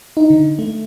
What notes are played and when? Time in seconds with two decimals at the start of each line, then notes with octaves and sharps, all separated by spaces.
0.17 D#4
0.30 D3
0.59 A3